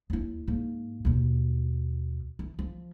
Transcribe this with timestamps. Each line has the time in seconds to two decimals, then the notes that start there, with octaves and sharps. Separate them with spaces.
0.10 D#2 E4
0.48 G#2 A#3
1.05 D#2 B2
2.39 E3
2.59 F3